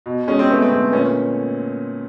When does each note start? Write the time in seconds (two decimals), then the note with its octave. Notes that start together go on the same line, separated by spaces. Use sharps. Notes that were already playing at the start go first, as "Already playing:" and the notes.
0.06 B2
0.28 G#3 C#4
0.39 C4
0.49 A3 B3
0.62 C4
0.71 D3
0.92 A#2 B3 C#4